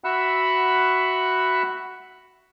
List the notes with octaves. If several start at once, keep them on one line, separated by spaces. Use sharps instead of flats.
F#4 E5 F#5 B5 E6 F#6